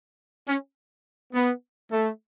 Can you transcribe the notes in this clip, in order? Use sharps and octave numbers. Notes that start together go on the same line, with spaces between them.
C#4
B3
A3